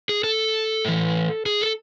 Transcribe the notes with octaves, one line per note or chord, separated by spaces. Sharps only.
G#4
A4
A2 E3
G#4
A4